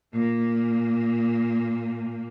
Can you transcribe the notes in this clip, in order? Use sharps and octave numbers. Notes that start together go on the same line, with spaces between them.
A#2 A#3